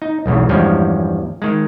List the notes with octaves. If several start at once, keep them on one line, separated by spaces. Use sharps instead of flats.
D#4
B1 E2 G#2 C#3
E2 G2 F3 G3 G#3 C#4
D#3 G#3